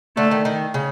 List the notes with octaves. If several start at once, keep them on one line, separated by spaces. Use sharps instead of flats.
D3 A3
D#3
D#3
C#3